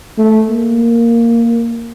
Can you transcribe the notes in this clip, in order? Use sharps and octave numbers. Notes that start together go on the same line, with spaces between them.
A3
A#3